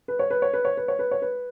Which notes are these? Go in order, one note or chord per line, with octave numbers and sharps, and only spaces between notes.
B4
C#5
B4
C#5
B4
C#5
B4
C#5
B4
C#5
B4